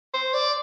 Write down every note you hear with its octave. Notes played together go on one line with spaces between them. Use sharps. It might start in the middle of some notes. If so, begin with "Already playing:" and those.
C5
D5